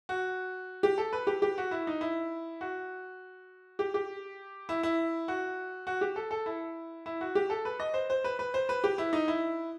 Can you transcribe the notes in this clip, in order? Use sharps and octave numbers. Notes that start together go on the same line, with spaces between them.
F#4
G4
A4
B4
G4
G4
F#4
E4
D#4
E4
F#4
G4
G4
E4
E4
F#4
F#4
G4
A4
A4
E4
E4
F#4
G4
A4
B4
D#5
C5
C5
B4
B4
C5
B4
G4
E4
D#4
E4